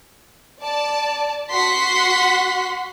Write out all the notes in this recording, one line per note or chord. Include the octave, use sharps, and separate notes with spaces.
D5 A5
F#4 F#5 C6 B6